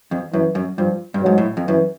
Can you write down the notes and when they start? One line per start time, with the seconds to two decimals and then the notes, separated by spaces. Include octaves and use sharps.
0.11 F2
0.33 F#2 E3
0.55 F#2
0.78 G2 F3
1.14 G2
1.23 G#2 F#3
1.38 A2
1.57 F2
1.67 F#2 E3